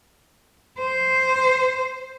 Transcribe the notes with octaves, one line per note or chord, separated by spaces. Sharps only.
C5